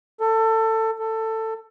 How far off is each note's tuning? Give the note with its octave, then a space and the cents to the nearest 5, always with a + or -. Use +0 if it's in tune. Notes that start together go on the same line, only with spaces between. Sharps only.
A4 +20
A4 +15